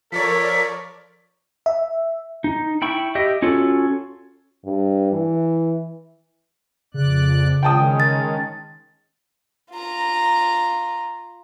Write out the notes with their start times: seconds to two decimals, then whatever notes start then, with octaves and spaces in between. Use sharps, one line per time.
0.12 F3 A4 A#4 C#5 D5 B6
1.66 E5
2.44 D#4
2.82 E4 G5 B5 C#6
3.15 G4 D#5 E5 G5
3.42 C#4 F4 F#4 A4 C#5
4.65 G2
5.12 E3
6.94 F2 C#3 D5 F#6
7.63 D#3 G#3 C#4 G5 A5 D#6
8.00 A6
9.71 F4 A#5